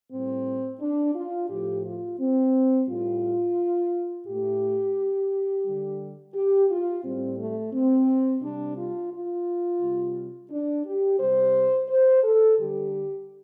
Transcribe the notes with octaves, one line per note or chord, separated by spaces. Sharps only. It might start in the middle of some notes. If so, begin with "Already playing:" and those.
A2 G3 C4
D4
F4
A2 F3 A3 G4
F4
C4
A2 G3 F4
A2 A3 G4
D3 G3
G4
F4
A2 G3 C4
A3
C4
C3 G3 D4
F4
F4
C3 G3
D4
G4
C3 G3 C5
C5
A4
D3 G3 G4